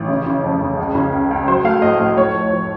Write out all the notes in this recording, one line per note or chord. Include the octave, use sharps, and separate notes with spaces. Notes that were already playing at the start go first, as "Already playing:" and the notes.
Already playing: A1
C#3
C#3
F2
C#3
C#2
C#3
C#2
C#2
F#3 C5
A3 F5
A2 D#5
A2 D#5
A2 C#5
F3
F3